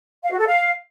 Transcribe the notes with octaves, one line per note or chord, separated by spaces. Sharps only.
F5
F#4
A4
F5